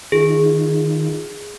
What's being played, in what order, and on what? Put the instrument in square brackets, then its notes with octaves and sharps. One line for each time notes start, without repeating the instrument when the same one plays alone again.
[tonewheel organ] D#3 D#4 F4 [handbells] G#4